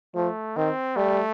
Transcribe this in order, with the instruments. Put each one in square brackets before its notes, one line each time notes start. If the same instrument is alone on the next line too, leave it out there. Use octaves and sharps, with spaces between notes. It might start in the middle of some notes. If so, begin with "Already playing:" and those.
[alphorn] F3 [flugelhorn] A3
[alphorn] D#3 [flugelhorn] C4
[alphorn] G3 [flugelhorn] A3